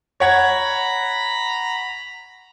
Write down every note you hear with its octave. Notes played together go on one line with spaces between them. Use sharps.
C#5 F#5 A#5 B5 G#6